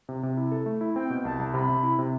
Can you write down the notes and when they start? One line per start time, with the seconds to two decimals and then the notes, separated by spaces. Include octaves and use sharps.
0.09 C3
0.23 C3
0.37 E4
0.52 A4
0.66 A3
0.81 E4
0.96 C4 G5
1.10 B2
1.25 C2 A5
1.40 C2
1.54 C3 B5
1.69 C3
1.83 E4
1.99 C3